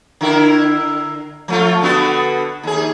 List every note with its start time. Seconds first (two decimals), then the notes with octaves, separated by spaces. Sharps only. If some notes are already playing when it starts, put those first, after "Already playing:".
0.21 D3 E4 A#4
1.48 F3 A3 F4
1.82 D3 B3 F#4
2.63 D#2 G#4